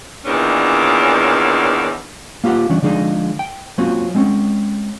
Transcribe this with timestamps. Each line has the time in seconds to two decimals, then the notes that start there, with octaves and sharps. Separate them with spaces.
0.25 E2 A#2 D#3 C#4 D4
2.44 A#3 F4 G4 F5 F#5
2.70 E3 G3 C#4 D4
2.82 D3 F3 G#3 D4 D#4 G#4
3.39 G5
3.78 F#3 A#3 C4 C#4 F4 F#4
4.15 G#3 C4 C#4